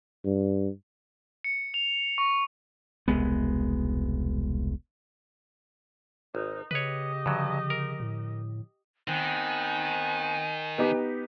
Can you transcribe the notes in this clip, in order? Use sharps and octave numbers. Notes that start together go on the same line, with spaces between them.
G2
C#7
F7
C#6
E1 C2 G#3 B3
G#1 D#4
C#3 G4 B4 C#5 D#5
G2 D3 F3 F#3
A#4
A2
D#3 B3 C4 G#5
B3 D#4 G4